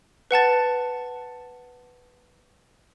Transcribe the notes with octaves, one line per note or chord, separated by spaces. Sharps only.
B4 F#5 A5 A6